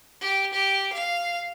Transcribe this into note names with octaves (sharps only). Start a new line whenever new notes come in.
G4
G4
F5